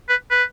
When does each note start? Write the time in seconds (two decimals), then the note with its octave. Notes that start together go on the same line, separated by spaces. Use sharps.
0.09 B4
0.30 B4